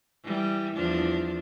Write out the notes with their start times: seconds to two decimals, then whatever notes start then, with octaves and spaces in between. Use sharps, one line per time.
0.24 E3 G3
0.75 E2 F3 D4